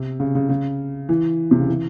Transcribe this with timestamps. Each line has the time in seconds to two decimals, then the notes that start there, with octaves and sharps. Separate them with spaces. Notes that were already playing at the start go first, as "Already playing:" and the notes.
Already playing: C3
0.20 C#3
0.35 C#3
0.49 C#3
1.09 E3
1.51 C3
1.60 C#3
1.68 E3